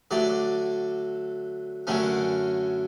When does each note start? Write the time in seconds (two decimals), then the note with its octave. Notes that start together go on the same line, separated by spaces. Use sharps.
0.11 D3 F#3 A3 D5
1.87 F#2 D3 A3 C#4